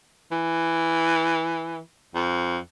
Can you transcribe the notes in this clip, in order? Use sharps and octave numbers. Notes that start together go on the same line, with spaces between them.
E3
F2